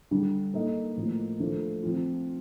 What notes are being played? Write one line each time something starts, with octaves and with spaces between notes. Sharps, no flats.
D3 G3 D4
A#3 D#4 A4 D#5
A2 F3 A#3
F3 A3 D4 F4
F3 C4 F4